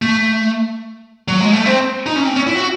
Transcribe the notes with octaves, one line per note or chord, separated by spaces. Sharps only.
A3
F#3
G#3
A3
C4
D#4
C#4
C4
C#4
E4
F#4